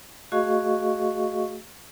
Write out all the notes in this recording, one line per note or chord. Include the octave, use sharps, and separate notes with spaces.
A3 F#4 G#4 D#5 F5 C#6